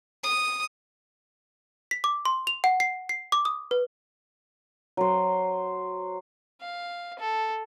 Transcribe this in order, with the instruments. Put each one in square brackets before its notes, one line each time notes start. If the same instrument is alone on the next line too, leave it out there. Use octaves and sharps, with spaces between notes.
[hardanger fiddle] D#6
[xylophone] B6
D6
C6
F7
F#5
C7
C7
D6
D#6
B4
[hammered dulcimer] F#3 C5
[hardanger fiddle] F5
A4